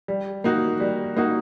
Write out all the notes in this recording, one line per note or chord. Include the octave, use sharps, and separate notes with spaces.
G3
A#3 D#4 F#4
G3
A#3 D#4 F#4